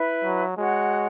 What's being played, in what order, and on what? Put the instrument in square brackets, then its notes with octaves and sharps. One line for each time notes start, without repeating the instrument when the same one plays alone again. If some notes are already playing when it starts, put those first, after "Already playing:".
Already playing: [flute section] E4 B4 E5
[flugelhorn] F#3
[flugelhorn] G#3 [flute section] F#4 C#5 F#5